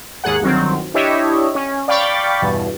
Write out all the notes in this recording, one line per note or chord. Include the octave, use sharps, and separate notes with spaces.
D#2 G#2 G#4 F#5
G1 D#3 F#3 C4
D4 E4 G4 C#5 D#5 E5
C#4
D5 F5 G5 B5 C#6 A6
E2 G2 B2